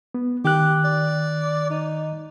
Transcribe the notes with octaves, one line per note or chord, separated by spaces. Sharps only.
B3
D#3 G4 F#6
D5
D#4